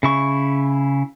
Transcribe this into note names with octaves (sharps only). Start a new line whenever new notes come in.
C#3 E4 C#6